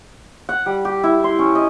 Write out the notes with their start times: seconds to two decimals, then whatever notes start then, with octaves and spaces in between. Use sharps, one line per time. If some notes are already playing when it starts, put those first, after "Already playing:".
0.49 F#5
0.66 G3
0.85 G4
1.04 E4
1.24 C6
1.39 C#4
1.55 D#5